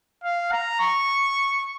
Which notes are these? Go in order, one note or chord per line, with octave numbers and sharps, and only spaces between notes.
F5
A#5
C#6